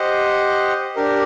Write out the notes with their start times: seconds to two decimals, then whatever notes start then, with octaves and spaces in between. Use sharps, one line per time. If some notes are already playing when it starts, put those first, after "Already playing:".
Already playing: G4 C5 D#5 F#5
0.96 D4 G4 A#4